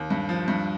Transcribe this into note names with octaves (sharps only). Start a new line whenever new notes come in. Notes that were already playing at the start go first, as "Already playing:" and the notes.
Already playing: D#2
G2
F3
G2